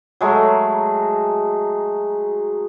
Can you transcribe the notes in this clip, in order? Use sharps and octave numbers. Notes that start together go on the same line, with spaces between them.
F#3 G#3 A3